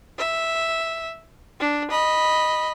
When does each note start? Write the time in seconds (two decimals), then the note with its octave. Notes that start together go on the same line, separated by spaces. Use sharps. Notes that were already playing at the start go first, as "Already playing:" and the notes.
0.19 E5
1.60 D4
1.91 D#5 B5